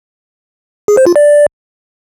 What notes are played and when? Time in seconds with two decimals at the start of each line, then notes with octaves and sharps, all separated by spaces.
0.88 G#4
0.97 C5
1.06 F4
1.16 D5